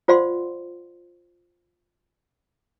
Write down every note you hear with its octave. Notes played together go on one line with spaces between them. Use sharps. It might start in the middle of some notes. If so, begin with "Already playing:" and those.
F4 C5 D5 F5 F#5 C6